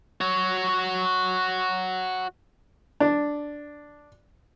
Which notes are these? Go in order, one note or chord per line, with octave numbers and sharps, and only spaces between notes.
F#4 C#5
D4